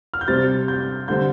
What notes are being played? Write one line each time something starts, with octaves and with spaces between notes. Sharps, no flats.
F6
G6
C3 G3 C4 A6
G6
D3 G3 C4 G6